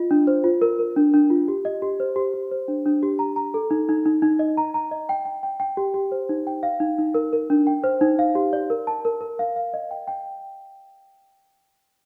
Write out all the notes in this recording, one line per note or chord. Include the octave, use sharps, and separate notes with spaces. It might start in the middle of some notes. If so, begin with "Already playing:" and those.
Already playing: F4 D#5
D4
C5
F4
A#4
A#4
D4
D4
F4
G4
D#5
G4
C5
G4
G4
C5
D4
D4
G4
A#5
A#5
A4
D#4
D#4
D#4
D#4
D#5
A#5
A#5
D#5
G5
G5
G5
G5
G4
G4
C5
D#4
G5
F5
D#4
D#4
A#4
A#4
D4
G5
C5
D#4
F5
G4
D5
A#4
A5
A#4
A#4
F5
F5
D#5
G5
G5